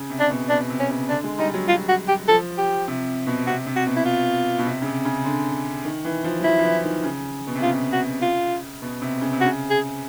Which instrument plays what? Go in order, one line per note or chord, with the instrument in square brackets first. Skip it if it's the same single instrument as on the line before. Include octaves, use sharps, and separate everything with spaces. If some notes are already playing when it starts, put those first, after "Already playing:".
Already playing: [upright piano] C#3
C3
[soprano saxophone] D4
[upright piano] B2
[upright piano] B2 [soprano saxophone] D4
[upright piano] C3
[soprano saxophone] C#4
[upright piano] C#3
[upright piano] D3 [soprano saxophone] D4
[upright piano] G#3
[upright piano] G3 [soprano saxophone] D#4
[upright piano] F#3
[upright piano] F#3 [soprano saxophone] F4
[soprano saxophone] F#4
G4
[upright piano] F3 [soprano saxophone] A4
[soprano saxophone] G4
[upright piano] C3
B2
[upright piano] C3 [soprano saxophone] F#4
[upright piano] C3
[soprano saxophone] F#4
[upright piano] B2
[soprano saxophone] E4
F4
[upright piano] B2
C3
C#3
C3
C#3
D3
D#3
E3
F3
F#3
[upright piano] F3 [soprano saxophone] E4
[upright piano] F3
E3
D#3
C#3
B2
C3
[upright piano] C#3 [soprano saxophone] F4
[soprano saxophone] F#4
F4
[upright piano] B2
C3
C#3
C3
[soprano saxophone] F#4
[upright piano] C#3
[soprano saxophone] G#4